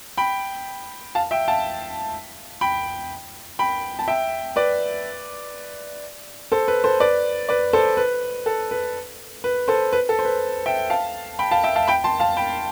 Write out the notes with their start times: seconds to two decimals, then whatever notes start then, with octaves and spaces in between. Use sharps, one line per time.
0.17 G5 B5
1.15 F5 A5
1.31 E5 G5
1.48 F5 A5
2.61 G5 B5
3.59 G5 B5
3.99 A5
4.08 E5 G5
4.56 B4 D5
6.52 A4 C5
6.68 B4
6.84 A4 C5
7.00 B4 D5
7.49 B4 D5
7.73 A4 C5
7.97 B4
8.46 A4
8.71 B4
9.44 B4
9.68 A4 C5
9.93 B4
10.09 A4
10.19 C5
10.25 B4
10.66 E5 G5
10.90 F5 A5
11.39 G5 B5
11.51 F5 A5
11.64 E5 G5
11.76 F5 A5
11.87 G5 B5
12.04 A5 C6
12.20 F5 A5
12.37 G5 B5